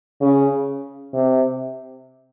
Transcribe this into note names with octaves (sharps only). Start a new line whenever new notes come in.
C#3
C3